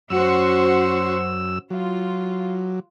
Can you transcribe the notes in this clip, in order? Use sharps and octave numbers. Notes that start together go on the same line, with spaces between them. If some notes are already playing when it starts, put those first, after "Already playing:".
F#2 C#4 F#4 C5 E6
F#3 F4